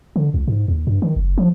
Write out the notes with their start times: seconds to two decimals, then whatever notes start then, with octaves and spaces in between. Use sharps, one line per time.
0.16 D3
0.34 C#2
0.48 G#2
0.68 D#2
0.87 G2
1.02 D#3
1.16 F#1
1.38 F3